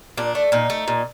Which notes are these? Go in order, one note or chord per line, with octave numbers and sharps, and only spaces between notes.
A#2 D4
A3
A#2 D#4
A3
A#2